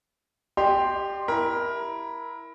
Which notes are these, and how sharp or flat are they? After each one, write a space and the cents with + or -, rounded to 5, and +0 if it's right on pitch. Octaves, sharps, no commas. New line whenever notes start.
G4 +5 D5 +45 C6 +0
E4 +0 A#4 +20